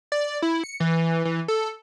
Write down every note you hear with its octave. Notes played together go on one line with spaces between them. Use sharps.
D5
E4
C#7
E3
E3
A4